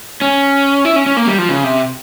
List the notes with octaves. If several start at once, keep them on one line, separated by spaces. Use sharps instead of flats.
C#4
E4
C#4
C#4
A#3
G3
F3
C#3
C3